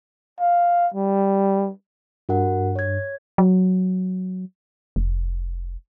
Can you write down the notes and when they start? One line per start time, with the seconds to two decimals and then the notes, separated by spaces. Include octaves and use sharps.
0.40 F5
0.94 G3
2.29 G2 F#4 A#4 F#5
2.76 C#5 G#6
3.38 F#3
4.96 F1